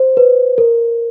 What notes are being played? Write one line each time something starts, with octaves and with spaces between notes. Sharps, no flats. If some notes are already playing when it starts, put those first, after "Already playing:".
Already playing: C5
B4
A#4